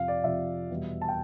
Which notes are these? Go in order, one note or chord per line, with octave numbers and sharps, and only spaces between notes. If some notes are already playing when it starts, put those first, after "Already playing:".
Already playing: F2 C3 F3 F5
D5
F2 C3 F3 E5
E2 B2 G3
A5
G5